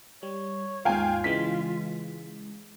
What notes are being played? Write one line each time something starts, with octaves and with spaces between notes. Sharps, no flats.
G3 C#5
D#2 G#2 F4 F5 G5 G#5
C#3 E3 G#3 B6